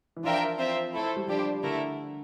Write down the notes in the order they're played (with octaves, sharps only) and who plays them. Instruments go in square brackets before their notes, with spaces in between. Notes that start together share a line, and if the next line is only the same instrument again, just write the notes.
[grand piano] E3
[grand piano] F3 [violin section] D4 F4 A#4 E5 G5
[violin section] C4 F4 C5 E5
A3 E4 A4 C5
[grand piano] G3
[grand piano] F3 [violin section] D4 G4 C5
[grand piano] D3 [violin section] A3 E4 A#4